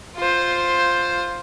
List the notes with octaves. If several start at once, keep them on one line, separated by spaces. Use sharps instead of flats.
F4 C5